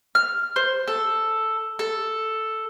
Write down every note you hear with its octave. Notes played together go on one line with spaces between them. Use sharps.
F6
C5
A4
A4